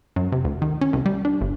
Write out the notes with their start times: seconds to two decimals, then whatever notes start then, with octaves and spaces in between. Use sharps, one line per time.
0.16 F#2
0.32 C3
0.44 D2
0.62 D#3
0.81 C#4
0.93 C2
1.06 G3
1.25 D4
1.41 G1